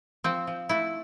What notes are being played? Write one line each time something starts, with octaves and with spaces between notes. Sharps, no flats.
F3 C4
F3
A3 E4